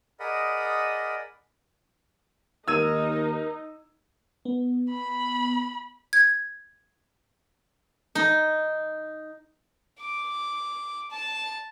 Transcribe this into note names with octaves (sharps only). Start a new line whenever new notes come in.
G#4 A#4 D5 D#5 F#5 B5
D#2 D#4 A#4 E6 G#6 D#7
B3
B5
G#6
D#4
D6
A5